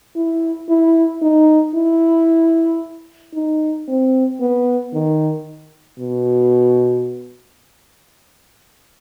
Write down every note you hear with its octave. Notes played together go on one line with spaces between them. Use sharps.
E4
E4
D#4
E4
D#4
C4
B3
D#3
B2